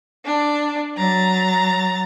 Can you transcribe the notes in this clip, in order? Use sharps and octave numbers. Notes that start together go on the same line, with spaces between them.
D4
F#3 A#5 A6